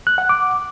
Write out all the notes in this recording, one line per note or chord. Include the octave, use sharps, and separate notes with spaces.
F#6
F#5
D6